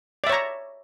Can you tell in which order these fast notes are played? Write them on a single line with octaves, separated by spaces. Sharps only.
D5 E5 C#5 A#5